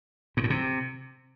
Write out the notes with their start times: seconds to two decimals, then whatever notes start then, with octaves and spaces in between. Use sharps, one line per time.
0.37 G#2
0.44 A2
0.50 C3